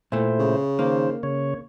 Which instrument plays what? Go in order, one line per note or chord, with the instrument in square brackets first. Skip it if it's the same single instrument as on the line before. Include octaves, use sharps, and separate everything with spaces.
[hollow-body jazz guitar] A#2 A3 [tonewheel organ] E4 C5
[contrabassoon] C#3
[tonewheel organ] D#3 C5 [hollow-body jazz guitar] A#3
[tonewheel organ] C#3 C#5